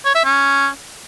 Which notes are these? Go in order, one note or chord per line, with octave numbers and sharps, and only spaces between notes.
C#5
E5
C#4